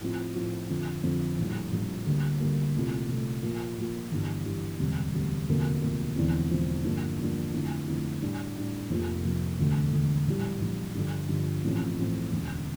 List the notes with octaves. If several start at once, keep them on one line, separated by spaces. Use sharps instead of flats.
A2 F3 C4 F4
A2 F3 C4 F4
F2 D3 F3
F2 D3 F3
A#1 A2 G3
A#1 A2 G3
D2 D3 G3 A#3
D2 D3 G3 A#3
C2 A#2 A3
C2 A#2 A3
A#2 F3 A#3 F4
A#2 F3 A#3 F4
G1 G2 E3
G1 G2 E3
E1 D2 C3 G3
E1 D2 C3 G3
E1 D2 C3 F3 A#3
E1 D2 C3 F3 A#3
E1 E2 D3 F3 C4
E1 E2 D3 F3 C4
G2 D3 F3 A#3 D4
G2 D3 F3 A#3 D4
F2 D3 A3 E4
F2 D3 A3 E4
A2 G3 D4
A2 G3 D4
F1 F2 C3 F3 A#3
F1 F2 C3 F3 A#3
E1 D2 D3 A3
E1 D2 D3 A3
A#1 A2 G3
A#1 A2 G3
G2 D3 F3
G2 D3 F3
A1 A2 F3 A3 C4
A1 A2 F3 A3 C4
E1 D2 D3